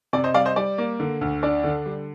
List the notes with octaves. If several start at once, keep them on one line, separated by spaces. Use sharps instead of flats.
C3 D5
C5 D#5
G3 D5 F5
C5 D#5
G3 D5
A#3
D3
D2
D4 D5
D3
G3